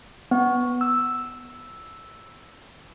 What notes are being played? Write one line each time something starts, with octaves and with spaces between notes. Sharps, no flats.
B3
E6